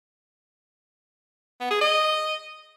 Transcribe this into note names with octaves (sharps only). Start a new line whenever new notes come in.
B3
G#4
D#5